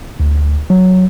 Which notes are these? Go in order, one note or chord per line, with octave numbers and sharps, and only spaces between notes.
D2
F#3